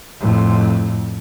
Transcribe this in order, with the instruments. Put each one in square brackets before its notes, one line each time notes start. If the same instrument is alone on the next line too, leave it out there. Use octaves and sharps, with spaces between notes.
[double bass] F2 A2